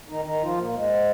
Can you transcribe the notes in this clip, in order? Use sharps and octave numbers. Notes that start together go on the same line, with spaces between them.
D#3 D#4
D#3 D#4
F3 F4
A#2 A#3
G#2 G#3